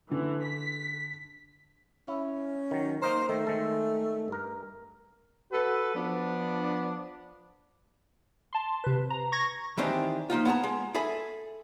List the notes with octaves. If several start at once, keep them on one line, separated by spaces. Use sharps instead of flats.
D3 E3
B6
C#4 E4
D#3 F#3
A#3 D#4 A#4 C5
D#3 A3
D#3 G#3 A4
G2 A#4
F#4 A4 B4
F3 B3 D4
A5 C6
C3 B4
A#5
C#6 G#6 A#6
D#3 E3 C4 D4 G4 G#4
F3 A#3 D#4 F4
B3 G#4 D#5 A5 A#5
G#3
G#4 A4 E5 G#5 B5